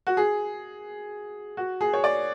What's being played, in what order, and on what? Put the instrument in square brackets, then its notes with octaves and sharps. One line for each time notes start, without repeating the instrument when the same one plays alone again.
[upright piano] F#4
G#4
F#4
G#4
C#5
D5